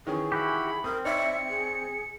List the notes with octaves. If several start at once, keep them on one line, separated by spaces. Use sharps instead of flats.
D#3 E3 C#4 G#4
E4 F#4 G4 B5
C4 A#4 D#6
D#4 C#5 D5 E5 C#7
G#4